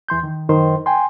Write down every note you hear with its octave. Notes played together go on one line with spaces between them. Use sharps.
E2 E3 C6 G6
D#3
F#2 D#3 C5 C6
G5 G#5 C6